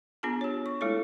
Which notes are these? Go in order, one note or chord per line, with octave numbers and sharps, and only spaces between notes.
B3 D4 F4 G#4 A5
G4 C#5
C#6
G#3 A3 E4 F4 A4 C#5